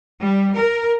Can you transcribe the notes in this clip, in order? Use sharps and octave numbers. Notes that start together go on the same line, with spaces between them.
G3
A#4